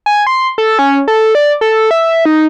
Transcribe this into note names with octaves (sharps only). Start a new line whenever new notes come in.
G#5
C6
A4
C#4
A4
D5
A4
E5
D#4